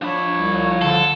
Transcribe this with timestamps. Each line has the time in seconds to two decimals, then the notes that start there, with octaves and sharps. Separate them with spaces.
0.02 F3 D4 C#5 B5
0.35 C2
0.81 D3 A4